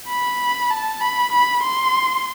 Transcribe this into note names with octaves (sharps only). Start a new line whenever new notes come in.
B5
A5
B5
B5
C6